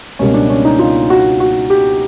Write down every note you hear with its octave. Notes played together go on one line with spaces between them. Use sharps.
C#2 B2 G3 A#3 C#4
D4
C#4
D#4
F4
F#4
F#4
G4